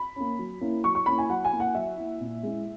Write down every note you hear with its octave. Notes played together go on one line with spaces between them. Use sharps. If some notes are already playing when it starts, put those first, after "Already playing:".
Already playing: B5
A#3 C#4
F#3
A#3 C#4 E4
F#3 C#6
C#6
A#3 C#4 E4 B5
G#5
F#3 F#5
G#5
A#3 E4
F#5
F#3 E5
A#3 E4
A#2
G#3 C#4 E4